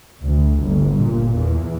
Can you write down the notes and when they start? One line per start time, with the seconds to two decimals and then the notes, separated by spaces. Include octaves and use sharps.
0.22 D2
0.62 G1
0.97 A#2
1.38 E2